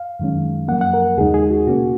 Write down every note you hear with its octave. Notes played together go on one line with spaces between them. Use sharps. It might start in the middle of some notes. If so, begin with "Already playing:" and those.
Already playing: F5
F#2 D#3 G#3 C#4
F#2 F3 A#3 F#5
F#5
A#4
D#2 C#3 G#3 D#4 G#4
G#4
F#4
B2 A#3 C#4 F#4